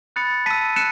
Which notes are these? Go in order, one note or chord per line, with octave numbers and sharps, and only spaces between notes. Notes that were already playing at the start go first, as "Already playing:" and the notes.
B5 D#6 F#6 A6 C#7
A5 E6 B6 D#7
F#6 C#7 E7